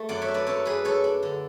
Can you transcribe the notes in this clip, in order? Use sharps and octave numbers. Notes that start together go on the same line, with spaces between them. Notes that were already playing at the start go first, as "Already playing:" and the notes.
Already playing: A3
F#2 D5 F#5
C#5 E5
D4
B4 D5
F#2 A4 C#5
D4 G#4 B4
D4 A4 C#5
D4
D3